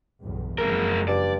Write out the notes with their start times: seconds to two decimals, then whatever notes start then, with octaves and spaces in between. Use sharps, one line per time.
0.22 B1 E2 G2
0.58 F#1 F3 G#3 A#4
1.08 G2 D5